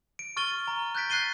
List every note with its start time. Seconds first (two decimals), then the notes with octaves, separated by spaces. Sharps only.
0.19 D7
0.37 C#6 F6 A6 D#7 G7
0.68 A#5
0.95 F#6 G6 A6 B6 D7
1.10 F#6 A6 C7 D#7 G7